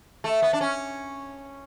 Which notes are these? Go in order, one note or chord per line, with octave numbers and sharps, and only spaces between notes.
A3
B3
D4
C#4